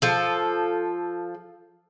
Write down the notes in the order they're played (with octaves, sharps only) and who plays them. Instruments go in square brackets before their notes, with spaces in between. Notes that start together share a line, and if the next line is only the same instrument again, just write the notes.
[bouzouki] F3 A4